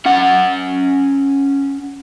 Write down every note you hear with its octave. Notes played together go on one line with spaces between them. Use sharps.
C#4 F#5